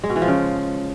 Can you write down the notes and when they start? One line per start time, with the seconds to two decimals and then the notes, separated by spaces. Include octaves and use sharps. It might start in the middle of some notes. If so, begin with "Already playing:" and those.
0.04 G#3
0.10 B2
0.16 E3
0.22 F3
0.28 C#3